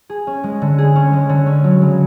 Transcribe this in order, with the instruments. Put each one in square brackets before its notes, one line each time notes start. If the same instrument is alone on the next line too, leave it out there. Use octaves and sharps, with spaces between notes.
[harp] G#4
C#4
G#3
D3
G#4
C#4
G#3
D3
C#4
F#3
C#3